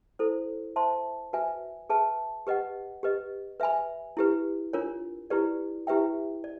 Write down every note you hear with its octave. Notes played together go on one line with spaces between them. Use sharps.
E4 A4 C5
C5 E5 A5 C6
F#4 B4 E5 G#5
G#4 B4 E5 A5
G4 B4 D#5 F#5
G4 B4 D#5
B4 E5 G#5 B5
E4 G4 B4
D4 F4 A#4 C#5
E4 G4 B4 D5
E4 G4 B4 E5 G5
D5